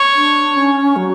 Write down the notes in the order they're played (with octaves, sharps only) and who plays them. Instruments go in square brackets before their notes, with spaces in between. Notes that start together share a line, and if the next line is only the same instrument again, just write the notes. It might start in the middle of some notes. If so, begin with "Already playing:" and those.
Already playing: [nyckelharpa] C#5
[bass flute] D4
C#4
F#3